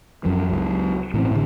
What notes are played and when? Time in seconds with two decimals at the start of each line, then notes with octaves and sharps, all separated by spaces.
0.25 F#2 F3
0.49 C#2 F#3
1.14 A2 E3 C4
1.31 A2 D3